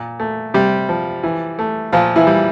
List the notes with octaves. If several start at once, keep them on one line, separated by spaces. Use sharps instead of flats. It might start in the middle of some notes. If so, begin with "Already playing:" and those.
Already playing: A#2
A3
C3 G3 G4
F3
E3
A3
A#2 F3 F4
E3 E4
G3